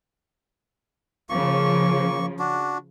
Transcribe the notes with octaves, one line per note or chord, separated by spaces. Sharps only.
C#3 F3 A#3 C#6
D4 F#4